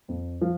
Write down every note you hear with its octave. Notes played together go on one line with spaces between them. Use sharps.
F2
F3